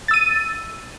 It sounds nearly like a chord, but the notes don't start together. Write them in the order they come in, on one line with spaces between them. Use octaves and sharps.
A6 E6 D#7